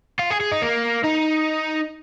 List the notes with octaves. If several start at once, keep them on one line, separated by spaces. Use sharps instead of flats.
F4
G#4
G#4
D#4
A#3
D#4